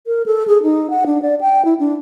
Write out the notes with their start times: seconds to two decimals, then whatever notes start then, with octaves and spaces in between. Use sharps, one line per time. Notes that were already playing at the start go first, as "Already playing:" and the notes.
0.07 A#4
0.26 A4
0.47 G#4
0.63 D#4
0.90 F#5
1.06 D4
1.22 D5
1.41 G5
1.65 E4
1.80 D4